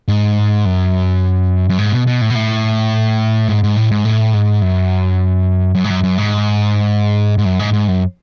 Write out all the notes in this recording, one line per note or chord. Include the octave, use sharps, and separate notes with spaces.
G#2
F#2
F#2
G#2
B2
B2
A2
B2
A2
G#2
G#2
A2
G#2
A2
G#2
F#2
F#2
G#2
F#2
F#2
G#2
G#2
F#2
G#2
G#2
F#2